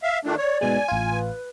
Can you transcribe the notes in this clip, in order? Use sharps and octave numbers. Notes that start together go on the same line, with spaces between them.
E5 F5
D#3 A3 D4 F4
C#5 D5
G#2 B2 G#3 G#5
A1 F4
B4